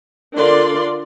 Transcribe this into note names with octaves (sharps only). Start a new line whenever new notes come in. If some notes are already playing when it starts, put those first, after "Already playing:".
D3 D4 F4 A#4 D5 C6